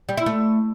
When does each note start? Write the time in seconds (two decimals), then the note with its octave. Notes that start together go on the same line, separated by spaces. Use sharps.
0.09 G3
0.17 E4
0.26 A3